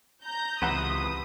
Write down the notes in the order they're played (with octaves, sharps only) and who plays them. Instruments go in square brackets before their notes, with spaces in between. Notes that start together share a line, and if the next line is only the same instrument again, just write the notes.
[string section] A#5 G6
[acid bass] C#2 [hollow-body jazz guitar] C3 E3 F#5 [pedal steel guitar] B4 C5 E5 [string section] D#6